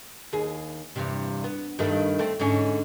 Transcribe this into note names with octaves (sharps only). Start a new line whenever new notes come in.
D#2 G#4
E2 G2 C3
B3
G2 D#3 A3
A3 C4
G#2 D3 C#4